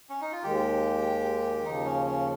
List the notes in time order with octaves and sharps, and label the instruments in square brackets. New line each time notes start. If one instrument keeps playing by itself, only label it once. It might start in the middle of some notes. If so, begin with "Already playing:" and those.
[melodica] C#4
D#4
F4
[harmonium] D#2 D#3 G#3 [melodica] G4
[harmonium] D#2 C#3 F3 [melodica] D#4
[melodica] C#4
C#4